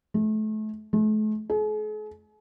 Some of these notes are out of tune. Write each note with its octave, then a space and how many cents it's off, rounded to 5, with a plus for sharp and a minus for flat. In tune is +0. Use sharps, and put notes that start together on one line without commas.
A3 -30
A3 -40
G#4 +45